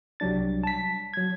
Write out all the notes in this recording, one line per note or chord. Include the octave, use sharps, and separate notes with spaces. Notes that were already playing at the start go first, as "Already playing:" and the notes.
C2 F#3 G3 D4 A6
A5 B6
F#3 G#6